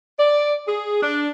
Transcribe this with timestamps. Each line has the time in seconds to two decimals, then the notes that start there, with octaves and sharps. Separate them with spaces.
0.18 D5
0.67 G#4
1.01 D4